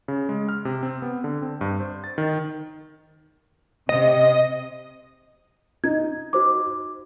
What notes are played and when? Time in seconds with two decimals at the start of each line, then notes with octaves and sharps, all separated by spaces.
0.08 C#3
0.29 G#3
0.49 F6
0.65 C3
0.83 C4
1.02 B3
1.24 D3
1.42 C4
1.61 G2
1.80 C5
2.04 A6
2.18 D#3
3.89 C3 D#5
5.84 D#4 G#6
6.33 F#4 C5 D6